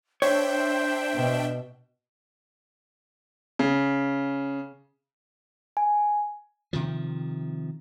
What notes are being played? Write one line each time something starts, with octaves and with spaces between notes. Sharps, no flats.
D4 C5 C#5 E5 G5
B2
C#3
G#5
C3 D#3 F3